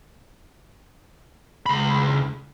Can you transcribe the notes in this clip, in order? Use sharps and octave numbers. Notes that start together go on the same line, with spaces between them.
C#2 B5